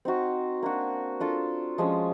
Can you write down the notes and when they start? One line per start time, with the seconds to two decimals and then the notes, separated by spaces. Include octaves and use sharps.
0.05 C4 D#4 F#4
0.62 A#3 D4 F#4
1.20 D4 F4 A4
1.78 F3 G#3 C#4